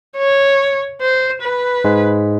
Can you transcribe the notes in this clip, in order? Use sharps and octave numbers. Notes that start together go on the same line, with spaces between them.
C#5
C5
B4
G#2 G#3